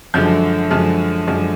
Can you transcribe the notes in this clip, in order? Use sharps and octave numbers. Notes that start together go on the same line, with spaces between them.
F#2 D3 F3 G#3 G6
F#2 D3 F3 G#3
F#2 D3 F3 G#3